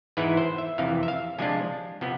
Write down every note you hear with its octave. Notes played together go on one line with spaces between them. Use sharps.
G#2 E3 G#3 B3 E4 B4
C5
E5
F2 C3 E3 F5
E5
F5
C3 F3 G#3 D4 F4 G#5
C3 F3 B3